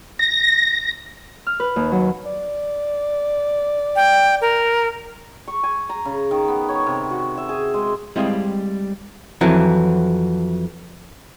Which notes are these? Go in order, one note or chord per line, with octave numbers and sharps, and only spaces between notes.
A#6
F6
B4
D#2
F#3
D5
G5
A#4
C#6
G#5
A#5
C#3
D#3
B3
C#5
C3
F#4
E5
G#4
G#3
G3 G#3 C4 E4 D#5 F5
F2 E3 F#3